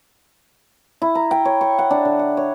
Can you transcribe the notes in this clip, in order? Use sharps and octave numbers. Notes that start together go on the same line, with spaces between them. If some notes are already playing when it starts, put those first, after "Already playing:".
E4
A#5
G5
C#5
C#6
F#5
D4
D3
F#5
C#5